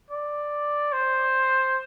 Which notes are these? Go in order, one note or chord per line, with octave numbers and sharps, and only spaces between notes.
D5
C5